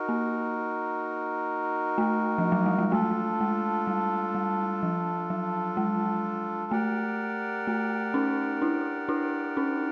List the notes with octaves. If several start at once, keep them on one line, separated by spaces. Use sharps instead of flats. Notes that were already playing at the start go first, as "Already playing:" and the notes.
Already playing: D#4 F#4 A#4
A#3
A3
F3
F#3
G3
G#3
A3 D4 F4 A4
G#3
G3
G3
F3
F#3
G#3
A3 G4 A#4 D5 F#5
A3
C#4 D#4
D4 E4
D4 E4
C#4 D#4